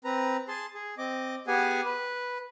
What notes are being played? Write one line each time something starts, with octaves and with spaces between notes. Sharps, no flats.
C4 B4 A#5
G#4 A5 C6
G#4
C4 D#5 D6
B3 G4 G#4 F#5 G#5
B4